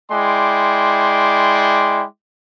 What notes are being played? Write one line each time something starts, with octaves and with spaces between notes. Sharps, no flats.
G#3 E4 D5 G5 C6 D6